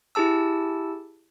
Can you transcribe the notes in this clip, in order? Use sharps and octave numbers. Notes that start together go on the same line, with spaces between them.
E4 G4 G#4 A5 E6